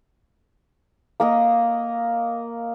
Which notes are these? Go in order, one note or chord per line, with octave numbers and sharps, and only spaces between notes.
A#3 A#4 D#5